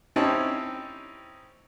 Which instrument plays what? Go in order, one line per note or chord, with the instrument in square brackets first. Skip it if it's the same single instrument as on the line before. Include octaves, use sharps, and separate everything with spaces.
[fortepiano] C4 C#4 D#4 E4 G4 A5